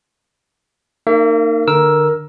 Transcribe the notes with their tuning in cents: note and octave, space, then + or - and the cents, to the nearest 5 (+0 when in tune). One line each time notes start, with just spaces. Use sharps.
A#3 -25 D#4 -20 E5 +40
D3 +25 A#4 +15 E6 +0